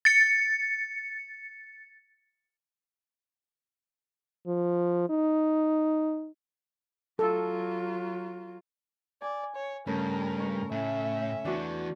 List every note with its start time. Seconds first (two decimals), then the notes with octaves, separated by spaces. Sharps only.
0.05 A6 C#7
4.47 F3
5.09 D#4
7.19 F#3 F4 A4
9.22 D5 G#5
9.55 C#5
9.87 G2 C#3 A3 C#4 A#4
10.40 C#6
10.72 A2 C#4 E5
11.45 E3 B3 D4 F#4 C#6